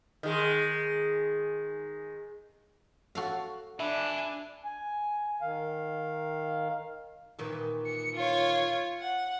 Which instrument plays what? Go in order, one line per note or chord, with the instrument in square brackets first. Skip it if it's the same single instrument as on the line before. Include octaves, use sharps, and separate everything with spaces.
[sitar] D#3 G#3
[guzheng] F#4 A4 F5
[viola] D4 [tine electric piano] E5 [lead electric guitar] G#5 B5
[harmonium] G#5
D#3 F5
[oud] A#2 D#3 E3
[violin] C#7
F4 C#5
F#5